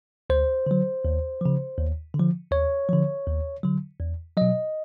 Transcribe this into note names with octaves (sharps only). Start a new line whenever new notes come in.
D2 C5
D3 F#3
D#2
C#3 F3
D#2
D3
F3
D#2 C#5
D3 F3
D#2
D3 F#3
E2
B2 F#3 D#5